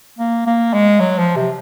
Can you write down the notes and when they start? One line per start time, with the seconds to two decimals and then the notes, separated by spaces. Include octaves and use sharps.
0.19 A#3
0.47 A#3
0.73 G#3
1.00 F#3
1.18 F3
1.36 C3